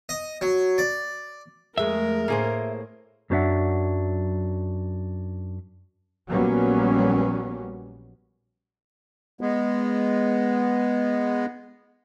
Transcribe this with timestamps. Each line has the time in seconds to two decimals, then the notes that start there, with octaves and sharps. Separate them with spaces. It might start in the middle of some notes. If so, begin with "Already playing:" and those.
0.09 D#5
0.41 F#3
0.78 D5
1.78 F2 G#3 A3 A#4 E5
2.28 A2 A#3 G#4 C5
3.30 F#2 F#3 C4 D4 E5 F#5
6.28 A#1 F#3 G3 A#3 B3 C#4
9.41 G#3 B3